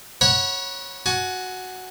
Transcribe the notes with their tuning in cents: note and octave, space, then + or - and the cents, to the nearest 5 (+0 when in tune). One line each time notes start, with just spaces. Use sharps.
C#5 -15 F#5 +0 B5 -35
F#4 +0 G#5 +25